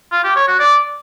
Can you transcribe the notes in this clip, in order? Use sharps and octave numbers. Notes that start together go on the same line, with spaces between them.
F4
G4
C#5
F#4
D5